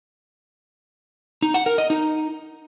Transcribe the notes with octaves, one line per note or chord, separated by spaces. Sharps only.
D#4
F#5
A#4
D#5
D#4